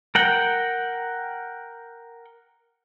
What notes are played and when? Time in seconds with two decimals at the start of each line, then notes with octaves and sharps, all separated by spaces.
0.15 A#4 F#5 G5